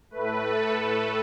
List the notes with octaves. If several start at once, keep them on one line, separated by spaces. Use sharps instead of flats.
A2 A3 B4
A4
B4